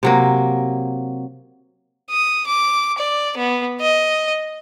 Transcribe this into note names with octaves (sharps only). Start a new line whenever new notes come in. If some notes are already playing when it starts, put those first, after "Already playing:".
C3 F#3 A#3
D#6
D6
D5
B3
D#5